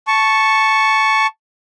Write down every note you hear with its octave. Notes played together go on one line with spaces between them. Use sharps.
A5 C#6